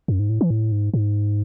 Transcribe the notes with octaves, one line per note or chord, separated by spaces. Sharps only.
F#2
G#2
A2
E3
A2
G#2
G#2